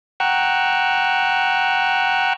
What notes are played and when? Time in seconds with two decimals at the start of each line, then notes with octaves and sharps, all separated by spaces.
0.20 F#5 G5 A#5 C#6 E6 F#6